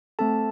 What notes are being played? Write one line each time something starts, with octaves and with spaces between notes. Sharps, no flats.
A3 C4 A4 A5